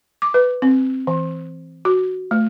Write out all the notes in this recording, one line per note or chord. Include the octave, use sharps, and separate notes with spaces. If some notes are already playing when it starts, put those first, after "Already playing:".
D6
B4
C4
E3
F#4
A3